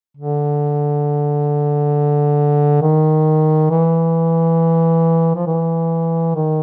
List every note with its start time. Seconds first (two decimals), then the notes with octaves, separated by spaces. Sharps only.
0.17 D3
2.82 D#3
3.70 E3
5.36 F3
5.46 E3
6.35 D#3